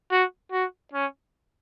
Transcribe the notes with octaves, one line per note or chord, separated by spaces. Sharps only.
F#4
F#4
C#4